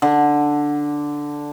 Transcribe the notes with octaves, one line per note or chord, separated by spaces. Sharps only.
D3